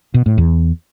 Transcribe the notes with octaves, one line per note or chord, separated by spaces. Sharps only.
B2
A2
E2